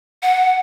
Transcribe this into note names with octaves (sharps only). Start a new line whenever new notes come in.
F#5